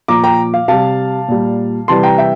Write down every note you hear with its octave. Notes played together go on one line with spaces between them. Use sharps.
A#2 F3 A#5 D6
G5 A#5
F5
C3 G3 F5 A5
A#2 G3
C3 E3 G3 A5 C6
G5 A#5
E5 G5